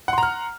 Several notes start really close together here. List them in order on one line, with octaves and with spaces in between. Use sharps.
F#5 C6 A#5 F6